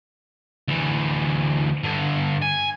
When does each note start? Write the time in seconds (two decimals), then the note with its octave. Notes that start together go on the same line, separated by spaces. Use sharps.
0.68 D2 E3
1.84 G2 D3
2.42 G#5